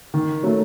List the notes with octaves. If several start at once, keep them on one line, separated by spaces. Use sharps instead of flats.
D#3
F#3 A3